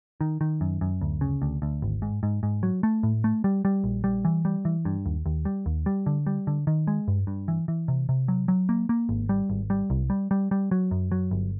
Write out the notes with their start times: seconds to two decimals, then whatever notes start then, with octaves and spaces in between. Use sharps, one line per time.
0.21 D#3
0.41 D#3
0.61 F#2
0.81 F#2
1.01 D2
1.21 C#3
1.42 D2
1.62 D2
1.82 G#1
2.02 G#2
2.23 G#2
2.43 G#2
2.63 F#3
2.83 A3
3.03 A2
3.24 A3
3.44 G3
3.65 G3
3.84 A#1
4.04 G3
4.25 E3
4.45 G3
4.65 E3
4.85 G2
5.06 D#2
5.26 D#2
5.45 G3
5.66 D#2
5.86 G3
6.06 D3
6.27 G3
6.47 D3
6.67 D#3
6.87 G#3
7.08 G2
7.27 G2
7.48 E3
7.68 E3
7.88 C3
8.09 C3
8.28 F#3
8.48 F#3
8.69 A#3
8.89 A#3
9.09 G#1
9.29 G3
9.50 G#1
9.70 G3
9.90 C2
10.10 G3
10.31 G3
10.51 G3
10.71 F#3
10.91 F#2
11.12 F#3
11.31 G1